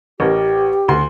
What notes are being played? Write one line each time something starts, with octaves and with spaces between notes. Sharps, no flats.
A1 G4 A#4
D2 C6